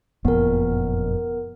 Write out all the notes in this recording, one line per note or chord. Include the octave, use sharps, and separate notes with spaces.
F#1 F2 A#2 B3 A#4